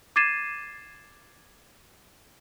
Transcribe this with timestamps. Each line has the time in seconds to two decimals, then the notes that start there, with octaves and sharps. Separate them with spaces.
0.16 D6 G#6 A6 C7 D#7 E7